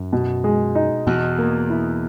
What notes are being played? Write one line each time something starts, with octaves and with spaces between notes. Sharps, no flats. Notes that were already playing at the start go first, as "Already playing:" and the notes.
Already playing: F#2
B2
G#3
D#4
E2 B2
A#3
E4